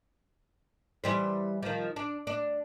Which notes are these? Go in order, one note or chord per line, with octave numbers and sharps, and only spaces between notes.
E3 G3 C5
D#3 F3
D4
D4